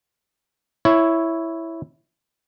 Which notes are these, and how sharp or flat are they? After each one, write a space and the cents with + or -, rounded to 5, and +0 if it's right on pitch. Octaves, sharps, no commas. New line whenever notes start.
E4 +0 C#5 +0